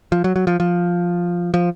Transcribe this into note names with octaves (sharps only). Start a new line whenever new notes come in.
F3
F#3
F#3
F3
F3
F3